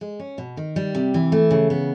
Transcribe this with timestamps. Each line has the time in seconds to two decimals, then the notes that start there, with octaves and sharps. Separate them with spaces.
0.01 G#3
0.20 C#4
0.38 B2
0.57 D#3
0.76 G3
0.95 C3
1.14 E3
1.32 A3
1.51 C#3
1.70 B3